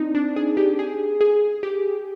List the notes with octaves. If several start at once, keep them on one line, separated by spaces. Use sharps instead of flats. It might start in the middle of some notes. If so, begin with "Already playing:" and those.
Already playing: C4 D4 D#4
D4
G#4
G4
G#4
G#4
G4